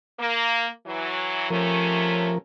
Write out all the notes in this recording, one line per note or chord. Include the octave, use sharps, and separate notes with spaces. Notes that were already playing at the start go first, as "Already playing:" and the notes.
A#3
E3 F#3
C3 F3 A3 C#4 A#4